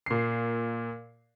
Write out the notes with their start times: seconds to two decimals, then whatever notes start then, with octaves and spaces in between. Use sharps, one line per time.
0.06 A#2 C7